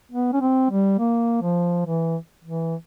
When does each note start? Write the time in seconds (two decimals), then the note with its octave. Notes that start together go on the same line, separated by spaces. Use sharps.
0.12 B3
0.33 C#4
0.41 C4
0.71 G3
0.99 A#3
1.42 F3
1.86 E3
2.45 E3